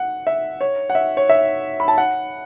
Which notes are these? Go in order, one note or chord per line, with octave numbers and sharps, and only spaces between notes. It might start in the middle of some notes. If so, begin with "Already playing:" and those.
Already playing: F#5
E5
C#5
F#5
E5
C#5
E5
B5
A5
F#5